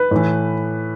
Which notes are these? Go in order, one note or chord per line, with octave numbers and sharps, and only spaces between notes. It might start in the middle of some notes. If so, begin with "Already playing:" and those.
Already playing: B4
A2 E3